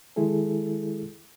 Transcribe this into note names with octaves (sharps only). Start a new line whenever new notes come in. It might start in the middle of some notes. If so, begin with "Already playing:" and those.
D#3 G#3 E4 G#4 A4